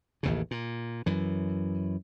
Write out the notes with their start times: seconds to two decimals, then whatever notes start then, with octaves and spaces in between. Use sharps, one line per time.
0.23 A1 D#2 C#3
0.51 A#2
1.06 F#2 E3